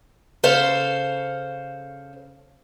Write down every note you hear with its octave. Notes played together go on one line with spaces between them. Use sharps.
C#3 A4 C5 F5